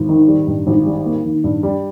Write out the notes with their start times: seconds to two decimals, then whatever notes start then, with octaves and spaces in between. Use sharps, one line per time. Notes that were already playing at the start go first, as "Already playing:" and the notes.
Already playing: G#1
0.09 D#3
0.28 G3
0.47 G2
0.67 G#1
0.86 G3
1.05 A#3
1.25 D#3
1.44 G2
1.63 G3